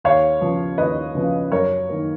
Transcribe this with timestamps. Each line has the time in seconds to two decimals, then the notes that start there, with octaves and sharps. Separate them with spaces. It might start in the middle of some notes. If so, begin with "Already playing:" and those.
0.04 D#2 C#5 F5
0.41 C#3 F3 B3
0.78 D#2 B4 D#5
1.15 C#3 F3 B3
1.52 F#2 A#4 C#5
1.89 D#3 A#3